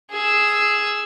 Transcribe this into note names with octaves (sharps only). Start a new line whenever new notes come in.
G#4 E6